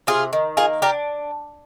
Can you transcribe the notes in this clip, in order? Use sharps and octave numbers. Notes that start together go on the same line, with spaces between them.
C3 F4 G#4
D#3
A#3 F4 G#4
D4 G4 A#4